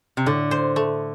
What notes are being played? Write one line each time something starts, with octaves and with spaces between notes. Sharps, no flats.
C3
A2 D3
C5
A3